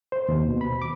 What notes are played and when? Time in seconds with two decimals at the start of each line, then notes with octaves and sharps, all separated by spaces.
0.12 C5
0.29 D#2
0.48 B2
0.61 B5
0.82 D6